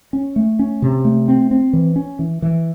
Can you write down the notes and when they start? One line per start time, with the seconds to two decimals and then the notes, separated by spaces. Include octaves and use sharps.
0.13 C#4
0.36 A3
0.59 C#4
0.82 C3
1.05 A3
1.28 C4
1.51 C4
1.73 E3
1.96 C#4
2.19 E3
2.42 E3